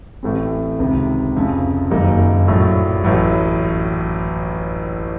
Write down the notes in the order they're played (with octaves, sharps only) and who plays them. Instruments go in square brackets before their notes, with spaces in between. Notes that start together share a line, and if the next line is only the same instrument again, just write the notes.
[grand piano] A1 A2 A3 C4
C#2 C3 D#3
F1 F2 C#3
F#1 F#2 D#3 A#3 D#4
A#1 A2 F#3
A1 A2 F#3